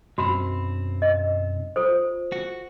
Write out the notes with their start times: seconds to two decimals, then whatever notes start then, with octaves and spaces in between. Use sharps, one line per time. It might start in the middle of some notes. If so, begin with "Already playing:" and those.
0.18 B1 F#2 C4 F#4 B5
1.02 D#5
1.76 F4 A4 C5
2.32 F#4